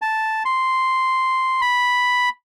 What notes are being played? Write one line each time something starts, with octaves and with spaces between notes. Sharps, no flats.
A5
C6
B5